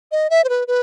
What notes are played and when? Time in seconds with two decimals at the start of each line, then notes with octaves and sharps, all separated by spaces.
0.12 D#5
0.30 E5
0.44 C5
0.49 B4
0.68 B4